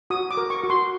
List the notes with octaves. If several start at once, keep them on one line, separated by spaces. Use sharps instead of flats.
F#4 D#6
D6
A#4
C#6
F#4
C6